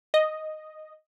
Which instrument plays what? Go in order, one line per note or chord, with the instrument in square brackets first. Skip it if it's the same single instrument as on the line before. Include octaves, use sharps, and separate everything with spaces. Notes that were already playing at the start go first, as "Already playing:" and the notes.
[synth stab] D#5